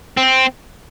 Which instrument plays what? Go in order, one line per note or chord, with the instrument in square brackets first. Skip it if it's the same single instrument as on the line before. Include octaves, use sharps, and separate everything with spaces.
[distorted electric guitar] C4